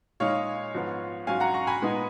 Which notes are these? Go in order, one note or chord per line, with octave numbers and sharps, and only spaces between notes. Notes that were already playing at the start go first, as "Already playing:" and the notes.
A#2 G#3 D#4 C#5 F5
G#2 F3 B3
G#2 F#3 C#4 F5 G#5
F#5 A#5
A#5 C#6
G#5 B5
A#2 G#3 B3 D#4